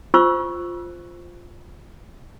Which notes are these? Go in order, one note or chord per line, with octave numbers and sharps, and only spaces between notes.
F4 C5 C#6 E6